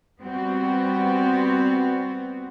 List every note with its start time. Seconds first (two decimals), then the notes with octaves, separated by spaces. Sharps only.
0.22 G3 B3 C4 F#4